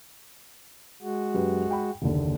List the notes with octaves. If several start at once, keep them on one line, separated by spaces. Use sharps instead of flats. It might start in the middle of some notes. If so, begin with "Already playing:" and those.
G#3 F#4
F#2 G4 B4
G5 B5
F#1 D#2 D3